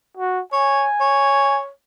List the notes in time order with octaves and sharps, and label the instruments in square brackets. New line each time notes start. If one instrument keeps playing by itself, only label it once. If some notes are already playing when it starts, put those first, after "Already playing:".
[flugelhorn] F#4
[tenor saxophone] C#5 [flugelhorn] G#5
[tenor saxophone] C#5